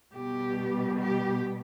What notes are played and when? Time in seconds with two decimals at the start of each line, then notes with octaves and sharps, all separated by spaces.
0.14 B2 G3 B3 G4
0.99 G4